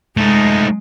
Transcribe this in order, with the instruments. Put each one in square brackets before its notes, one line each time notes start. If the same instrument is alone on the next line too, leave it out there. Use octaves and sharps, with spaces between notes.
[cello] G#3 [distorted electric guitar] A3 D#4